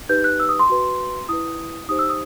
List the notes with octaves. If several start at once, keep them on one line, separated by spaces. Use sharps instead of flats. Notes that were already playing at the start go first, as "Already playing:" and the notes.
D#4 G4 B4 G6
F#6
E6
D#6
C6
F#4 B4
E4 B4 D#6
D#4 G4 C5 D#6
E6
D#6